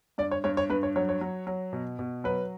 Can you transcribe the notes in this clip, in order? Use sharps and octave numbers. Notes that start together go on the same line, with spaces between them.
G2 D5
C#5
G2 C#5
C#5
G2 B4
C#5
F#3 C#5
C#5
F#3
F#3
B2
B2
F#3 B4